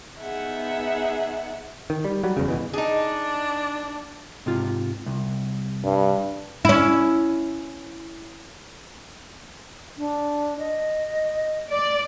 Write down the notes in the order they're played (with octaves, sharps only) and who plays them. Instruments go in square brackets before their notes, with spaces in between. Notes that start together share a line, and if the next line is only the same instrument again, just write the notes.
[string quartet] B3 D#4 G#4 E5 F#5
[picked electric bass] D#3
G3
F#3 G3
E1 E2 C#3
G1 B2 E3
[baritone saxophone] D4 [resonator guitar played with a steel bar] D#4 G#4
[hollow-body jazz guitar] G#2 C3 F4
C2
[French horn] G2
[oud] C#4 E4
[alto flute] D4
D#5
[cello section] D5